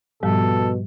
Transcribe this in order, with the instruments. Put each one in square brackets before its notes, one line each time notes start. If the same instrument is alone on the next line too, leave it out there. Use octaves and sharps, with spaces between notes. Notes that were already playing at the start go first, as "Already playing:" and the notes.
[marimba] G#2 F3 G3 [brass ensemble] B2 [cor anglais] A4